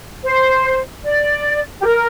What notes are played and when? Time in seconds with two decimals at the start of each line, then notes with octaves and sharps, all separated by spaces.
0.23 C5
1.04 D5
1.79 G4
1.86 A#4